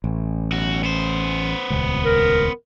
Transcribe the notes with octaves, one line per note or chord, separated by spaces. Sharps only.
A1
B1 F#4
B3 C5
D#1 C#2
A#4